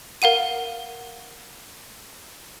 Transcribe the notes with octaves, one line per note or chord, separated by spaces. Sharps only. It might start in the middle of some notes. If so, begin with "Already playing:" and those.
A#4 F5 F#5 D#7